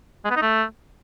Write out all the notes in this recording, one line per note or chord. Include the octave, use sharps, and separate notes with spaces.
G#3
B3
D#4
A3